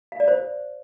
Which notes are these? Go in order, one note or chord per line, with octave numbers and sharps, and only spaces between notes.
F5
D5
C5